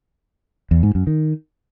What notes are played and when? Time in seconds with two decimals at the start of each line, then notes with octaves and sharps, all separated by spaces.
0.71 E2
0.83 G#2
0.95 F#2
1.07 D#3